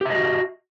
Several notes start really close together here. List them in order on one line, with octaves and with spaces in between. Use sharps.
G4 E5 D#5 F#4